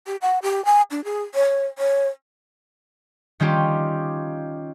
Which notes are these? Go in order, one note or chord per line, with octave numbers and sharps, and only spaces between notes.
G4
F#5
G4
G#5
D4
G#4
C#5
C#5
D#3 G3 C#4 F4 G4